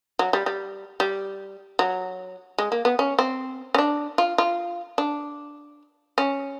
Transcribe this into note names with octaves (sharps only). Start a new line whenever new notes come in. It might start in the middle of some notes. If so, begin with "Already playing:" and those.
F#3
G3
G3
G3
F#3
G#3
A#3
B3
C#4
C4
C#4
D4
F4
F4
D4
C#4